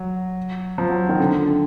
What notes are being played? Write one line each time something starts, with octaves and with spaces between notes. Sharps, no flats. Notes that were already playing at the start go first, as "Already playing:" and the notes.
Already playing: F#3
F3
F#3
D#3
D3